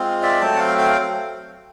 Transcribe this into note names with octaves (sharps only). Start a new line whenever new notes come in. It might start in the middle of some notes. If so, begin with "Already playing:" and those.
Already playing: G#3 C4 F4
D5 E5
F#3 A3 C4 G5 A5
F#5
F5 G5
F5 G5